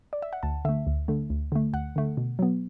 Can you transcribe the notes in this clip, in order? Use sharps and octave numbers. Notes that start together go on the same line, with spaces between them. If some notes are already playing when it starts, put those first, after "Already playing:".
D5
E5
F#5
D2 A5
D3 A3 E5
D2
D3 A3
D2
D3 A3
D2 F#5
D3 A3
B2
F#3 B3